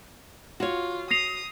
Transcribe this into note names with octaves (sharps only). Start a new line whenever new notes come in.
F4 F#4 C#5
D#6 A#6 C7 F7